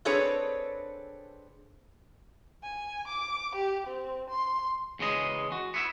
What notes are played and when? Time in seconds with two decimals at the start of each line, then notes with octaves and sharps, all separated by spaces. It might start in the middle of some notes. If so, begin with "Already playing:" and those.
0.05 C4 D4 G#4 A4 B4 C#5
2.63 G#5
3.08 D6
3.55 G4
3.87 C4
4.30 C6
4.99 E2 C#3 G#3 D#5
5.52 F#4
5.74 B3 E4 E5